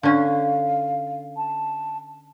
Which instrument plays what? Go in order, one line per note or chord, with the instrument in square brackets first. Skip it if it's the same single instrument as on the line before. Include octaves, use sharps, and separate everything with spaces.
[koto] D3 C#4 [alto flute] F5
[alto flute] A5